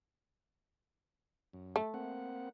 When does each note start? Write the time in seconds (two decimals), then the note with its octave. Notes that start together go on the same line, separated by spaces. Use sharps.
1.53 F#2
1.76 A3
1.94 A#3 C4 F#5